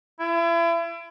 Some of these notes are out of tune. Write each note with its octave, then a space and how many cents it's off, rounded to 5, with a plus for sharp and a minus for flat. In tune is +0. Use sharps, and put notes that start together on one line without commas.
E4 +35